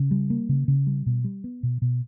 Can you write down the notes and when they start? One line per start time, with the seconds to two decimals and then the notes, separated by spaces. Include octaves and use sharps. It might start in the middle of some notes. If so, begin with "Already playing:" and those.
Already playing: C#3
0.11 G3
0.30 A#3
0.49 C#3
0.68 C#3
0.87 G3
1.06 B2
1.24 G3
1.44 B3
1.63 B2
1.82 B2